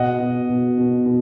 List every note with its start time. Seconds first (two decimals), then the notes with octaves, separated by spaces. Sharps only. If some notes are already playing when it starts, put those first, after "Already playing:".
Already playing: B2 D#5 F#5
0.19 B2
0.49 B2
0.78 B2
1.06 B2